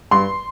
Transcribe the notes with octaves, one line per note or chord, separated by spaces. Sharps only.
G2 C6